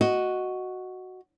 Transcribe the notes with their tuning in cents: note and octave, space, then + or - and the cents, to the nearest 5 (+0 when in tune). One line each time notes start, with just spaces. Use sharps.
F#4 +0 D#5 +0